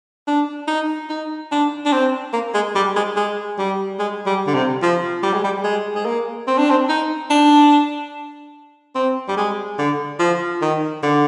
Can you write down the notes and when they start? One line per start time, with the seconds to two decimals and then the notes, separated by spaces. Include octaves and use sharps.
0.28 D4
0.68 D#4
1.09 D#4
1.51 D4
1.86 D4
1.93 C4
2.33 A#3
2.54 G#3
2.75 G3
2.96 G#3
3.16 G#3
3.58 G3
3.99 G#3
4.26 G3
4.47 D3
4.55 C3
4.83 F3
5.23 G3
5.34 G#3
5.44 G3
5.64 G#3
5.95 G#3
6.06 A#3
6.48 C4
6.58 D4
6.71 C4
6.89 D#4
7.30 D4
8.95 C4
9.28 G3
9.37 G#3
9.79 D3
10.20 F3
10.62 D#3
11.03 D3